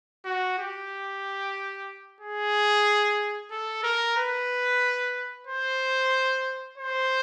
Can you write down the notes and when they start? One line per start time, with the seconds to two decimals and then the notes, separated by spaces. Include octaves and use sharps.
0.25 F#4
0.58 G4
2.21 G#4
3.51 A4
3.83 A#4
4.17 B4
5.47 C5
6.78 C5